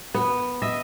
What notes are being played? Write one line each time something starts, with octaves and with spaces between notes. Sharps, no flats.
B3
D#5 E5